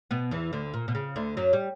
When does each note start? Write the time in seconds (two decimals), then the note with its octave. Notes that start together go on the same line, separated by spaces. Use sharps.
0.11 B2 B3
0.31 E2 E3
0.53 D2 D3
0.74 A#2
0.88 B2
0.95 C#3
1.16 D2 D3
1.37 F#2 F#3
1.53 G3